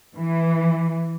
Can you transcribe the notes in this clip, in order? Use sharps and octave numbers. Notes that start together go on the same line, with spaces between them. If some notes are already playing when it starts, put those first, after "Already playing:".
E3